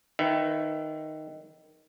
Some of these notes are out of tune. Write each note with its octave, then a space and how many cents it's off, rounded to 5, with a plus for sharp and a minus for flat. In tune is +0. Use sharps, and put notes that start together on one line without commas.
D#3 +0 B4 +20 E5 +15